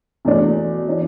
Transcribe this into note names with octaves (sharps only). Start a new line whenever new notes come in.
E2 B2 A3 D4
E3 D4